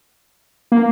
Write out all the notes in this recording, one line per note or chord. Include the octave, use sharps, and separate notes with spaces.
A#3